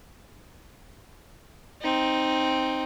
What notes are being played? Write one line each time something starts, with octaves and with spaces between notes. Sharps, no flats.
C4 D#4